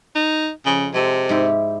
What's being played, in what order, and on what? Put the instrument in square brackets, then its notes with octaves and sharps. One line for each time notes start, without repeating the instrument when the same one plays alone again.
[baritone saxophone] D#4
[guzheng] F2 [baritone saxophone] C#3
[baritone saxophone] C3 [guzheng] G#3 A4
[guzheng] G#2 E4 G4